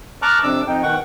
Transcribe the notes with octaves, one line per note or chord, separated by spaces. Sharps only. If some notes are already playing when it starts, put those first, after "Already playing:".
A5 A#5 C#6 D6 F6 F#6
F2 C3 D4 D6 E6
F2 D#4 G5
B2 D#3 F#5 G5 C#6